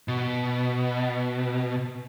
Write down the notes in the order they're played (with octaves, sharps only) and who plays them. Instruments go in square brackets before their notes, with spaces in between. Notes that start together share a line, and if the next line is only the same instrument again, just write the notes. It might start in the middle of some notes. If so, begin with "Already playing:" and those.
[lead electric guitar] B2